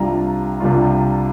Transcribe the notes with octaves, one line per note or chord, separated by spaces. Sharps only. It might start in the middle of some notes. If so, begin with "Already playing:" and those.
Already playing: C2 C3 G3 D4 F4 A#5
C2 C3 G3 D4 F4